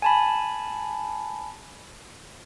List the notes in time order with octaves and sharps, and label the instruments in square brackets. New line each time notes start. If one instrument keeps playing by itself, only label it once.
[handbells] G#5 A5 B5